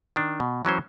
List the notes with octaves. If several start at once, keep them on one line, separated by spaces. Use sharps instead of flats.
D#3 D4
B2
E3 F#3 C#4 C5